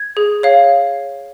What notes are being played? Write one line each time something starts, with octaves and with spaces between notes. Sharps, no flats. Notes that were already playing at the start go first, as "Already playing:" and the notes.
Already playing: G#6
G#4
C#5 F5